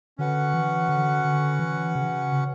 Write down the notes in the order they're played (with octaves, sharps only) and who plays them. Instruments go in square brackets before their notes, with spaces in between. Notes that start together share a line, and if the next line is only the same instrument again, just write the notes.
[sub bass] D3 [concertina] C#4 F#4 B4 F#5
[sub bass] E3
D3
D3
E3
C#3